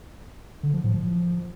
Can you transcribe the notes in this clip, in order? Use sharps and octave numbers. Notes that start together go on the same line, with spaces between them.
D3
F3
A2
F3